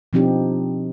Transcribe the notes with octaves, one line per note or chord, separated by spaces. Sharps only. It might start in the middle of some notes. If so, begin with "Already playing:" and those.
B2 F3 C4 D4 D#4 G4